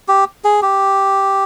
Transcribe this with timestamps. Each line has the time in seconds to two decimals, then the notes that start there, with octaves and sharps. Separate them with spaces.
0.08 G4
0.44 G#4
0.62 G4